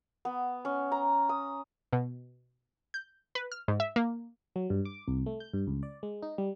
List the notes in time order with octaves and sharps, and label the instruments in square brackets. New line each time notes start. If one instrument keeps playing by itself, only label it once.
[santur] B3
C#4
A#5
D#6
[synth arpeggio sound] B2
G6
B4
F6
G#2
E5
A#3
[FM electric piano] F#3
G2
D6
C2
A3
G6
G2
C#2
D5
G#3
D#4
G3